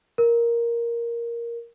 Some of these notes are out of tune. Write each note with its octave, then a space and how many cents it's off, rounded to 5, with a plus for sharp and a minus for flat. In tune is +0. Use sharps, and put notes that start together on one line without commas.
A#4 +5